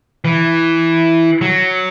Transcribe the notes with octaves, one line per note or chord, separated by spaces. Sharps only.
E3
F#3